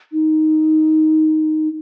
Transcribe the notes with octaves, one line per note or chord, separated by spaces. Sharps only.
D#4